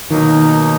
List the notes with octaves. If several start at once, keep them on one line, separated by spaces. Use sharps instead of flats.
B2 D#3 F#3 A#3 D#4